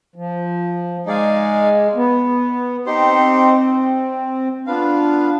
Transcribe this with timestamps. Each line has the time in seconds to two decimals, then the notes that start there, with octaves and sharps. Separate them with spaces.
0.16 F3
1.06 G#3 D#4 G#4 D5 F5 G#5
1.96 B3
2.86 C4 D#4 G4 C5
4.66 B3 D4 F4 B4 F5